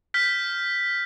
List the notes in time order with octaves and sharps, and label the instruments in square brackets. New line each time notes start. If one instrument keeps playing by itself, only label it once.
[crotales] F6 G6 B6